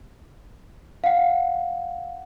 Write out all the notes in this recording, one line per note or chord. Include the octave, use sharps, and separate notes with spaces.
F5 F#5